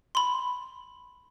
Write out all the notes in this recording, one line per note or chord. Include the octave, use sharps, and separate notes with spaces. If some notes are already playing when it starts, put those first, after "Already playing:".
B5 C6